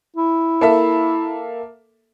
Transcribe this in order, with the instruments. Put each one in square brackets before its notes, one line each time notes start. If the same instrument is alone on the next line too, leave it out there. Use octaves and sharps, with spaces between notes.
[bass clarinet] E4
[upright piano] A#3 A4 E5